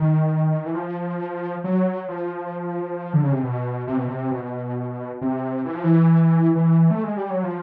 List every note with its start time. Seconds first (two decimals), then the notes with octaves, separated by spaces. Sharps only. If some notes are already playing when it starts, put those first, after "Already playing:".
Already playing: D#3
0.66 E3
0.75 F3
1.64 F#3
2.08 F3
3.13 D3
3.23 C#3
3.32 C3
3.43 B2
3.87 C3
3.97 B2
4.08 C3
4.31 B2
5.21 C3
5.65 E3
5.74 F3
5.84 E3
6.55 E3
6.91 A3
7.04 G#3
7.17 G3
7.30 F#3
7.44 F3